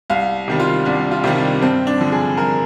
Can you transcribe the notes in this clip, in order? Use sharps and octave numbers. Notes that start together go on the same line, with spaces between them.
C2 F5
C3 D#3 G3
F4
C2 D4
F4
C3 D#3 G3
D4
G2 C4
D4
D3 F3
G#4
G2 A#4